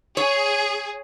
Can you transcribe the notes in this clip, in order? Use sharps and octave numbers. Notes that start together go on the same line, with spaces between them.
G#4 C#5